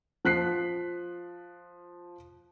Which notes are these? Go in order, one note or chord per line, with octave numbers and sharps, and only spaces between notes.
F3 F#6 B6 C7